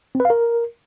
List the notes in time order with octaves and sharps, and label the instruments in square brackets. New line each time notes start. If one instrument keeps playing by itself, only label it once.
[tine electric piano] C4
B4
F5
A#4